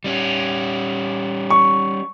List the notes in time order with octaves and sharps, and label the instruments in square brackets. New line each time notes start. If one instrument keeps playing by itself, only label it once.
[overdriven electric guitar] G3 C#4
[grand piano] C#6